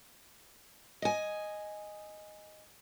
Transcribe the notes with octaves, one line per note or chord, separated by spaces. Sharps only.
D#5 G#5